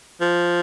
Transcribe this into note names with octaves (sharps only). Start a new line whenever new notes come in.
F3